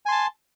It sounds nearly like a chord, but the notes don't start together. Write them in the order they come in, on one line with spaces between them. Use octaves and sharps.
G#5 C6 A5